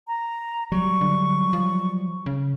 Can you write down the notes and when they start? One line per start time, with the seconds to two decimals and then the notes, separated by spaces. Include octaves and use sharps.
0.08 A#5
0.72 F#3 G3 C#6
1.01 D3
1.53 F3
2.26 C#3